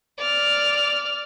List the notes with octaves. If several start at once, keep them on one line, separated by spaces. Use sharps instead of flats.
D5 F6